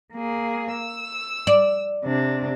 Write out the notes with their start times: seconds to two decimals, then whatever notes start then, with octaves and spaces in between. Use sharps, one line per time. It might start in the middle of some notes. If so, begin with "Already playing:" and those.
0.13 A#3 G#4
0.73 E6
1.47 D5
2.05 C3 D4